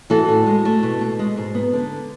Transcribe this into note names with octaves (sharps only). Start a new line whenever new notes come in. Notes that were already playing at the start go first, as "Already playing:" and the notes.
E3 F#4 A4
A2
G#3
A3
B2
B2
G#3
G#2
B3
D3